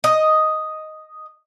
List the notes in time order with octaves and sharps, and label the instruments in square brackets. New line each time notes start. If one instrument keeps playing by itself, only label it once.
[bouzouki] D#5